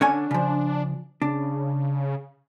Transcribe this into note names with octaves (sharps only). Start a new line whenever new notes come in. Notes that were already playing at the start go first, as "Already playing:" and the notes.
D3 C#4 D4 G#5
C#3 F3
C#3 D4